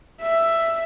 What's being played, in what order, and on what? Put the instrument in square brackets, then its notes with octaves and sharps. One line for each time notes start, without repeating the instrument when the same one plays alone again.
[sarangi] E5